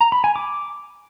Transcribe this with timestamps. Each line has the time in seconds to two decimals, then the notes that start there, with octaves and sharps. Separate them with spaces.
0.01 A#5
0.12 B5
0.24 G#5
0.36 D6